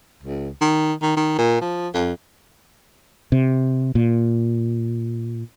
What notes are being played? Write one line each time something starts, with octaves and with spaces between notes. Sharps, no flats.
C#2
D#3
D#3
D#3
A#2
F3
F2
C3
A#2